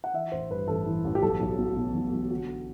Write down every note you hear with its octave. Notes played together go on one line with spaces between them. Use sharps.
F#5
E3 E5
A1 C5
G2 B4
A1 A4
E3
A1
G4
B1 A4
B1
B2
B2
B1
B1
D3 F#4